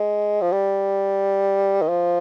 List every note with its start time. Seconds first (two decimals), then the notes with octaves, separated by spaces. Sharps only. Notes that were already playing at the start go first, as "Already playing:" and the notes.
Already playing: G#3
0.41 F3
0.52 G3
1.82 D#3
1.89 F3